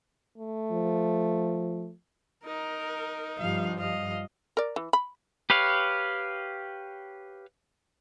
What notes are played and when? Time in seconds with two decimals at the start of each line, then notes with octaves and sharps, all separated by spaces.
0.38 A3
0.71 F3
2.45 D#4 A#4
3.39 G2 F3 G3 F5
3.79 D#5 F5
4.57 A#4 D5
4.76 E3
4.93 B5
5.50 G4 B4 C#5 F5